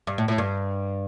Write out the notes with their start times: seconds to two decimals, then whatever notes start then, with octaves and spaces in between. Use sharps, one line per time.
0.07 G2
0.18 A2
0.28 A2
0.38 G2